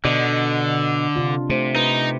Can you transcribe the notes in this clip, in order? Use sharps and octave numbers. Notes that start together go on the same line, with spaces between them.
B2 D3 D5 D#5
C3 D4 F4
C3 A3 C5
D#4 B4